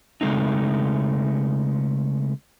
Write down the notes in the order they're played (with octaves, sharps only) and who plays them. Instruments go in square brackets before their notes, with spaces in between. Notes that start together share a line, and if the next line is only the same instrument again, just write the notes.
[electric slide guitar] C#3 G#3 A3 C4 D#4